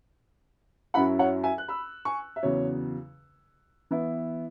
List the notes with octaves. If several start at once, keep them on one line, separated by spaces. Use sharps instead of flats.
F#2 F#3 C#4 E4 F#5 B5
C#5 F#5
E5 G#5
F#6
B5 E6
G#5 C#6
E5
E2 C#3 F#3 C#5
E3 B3 E4